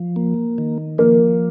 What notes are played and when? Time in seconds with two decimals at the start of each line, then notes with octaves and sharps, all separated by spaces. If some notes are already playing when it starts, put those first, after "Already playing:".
Already playing: F3
0.16 A#3
0.58 D#3
0.98 F3 A#3